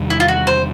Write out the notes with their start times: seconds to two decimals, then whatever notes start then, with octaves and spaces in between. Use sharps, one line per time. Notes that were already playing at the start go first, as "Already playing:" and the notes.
Already playing: E2 C3 D#3 G3
0.10 E4
0.20 F4
0.28 F#4
0.47 C5